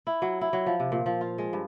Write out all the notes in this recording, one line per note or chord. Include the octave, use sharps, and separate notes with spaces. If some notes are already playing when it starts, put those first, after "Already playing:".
E4
F#3
E4
F#3
F3
C3
A#2
F3
F4
G#3
G2